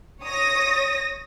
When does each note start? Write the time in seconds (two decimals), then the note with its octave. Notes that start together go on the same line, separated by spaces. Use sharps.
0.22 C#5 D#6 A#6